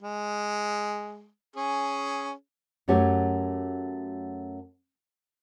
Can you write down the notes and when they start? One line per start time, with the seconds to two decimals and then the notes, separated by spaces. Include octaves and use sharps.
0.02 G#3
1.56 C#4 G#4
2.88 F#2 F#3 A3 C#4 G4 C#5